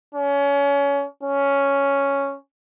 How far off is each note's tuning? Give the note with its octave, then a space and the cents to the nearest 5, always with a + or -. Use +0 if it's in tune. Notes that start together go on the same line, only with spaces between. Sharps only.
C#4 +25
C#4 +5